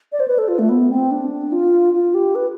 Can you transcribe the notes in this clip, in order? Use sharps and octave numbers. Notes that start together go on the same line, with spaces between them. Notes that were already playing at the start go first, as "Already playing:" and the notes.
D5
C5
B4
A4
F4
A3
B3
C4
D4
F4
F4
G4
B4